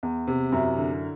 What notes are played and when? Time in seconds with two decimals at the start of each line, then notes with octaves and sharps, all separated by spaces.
0.03 E2
0.27 C3
0.52 F#2 E4
0.77 D3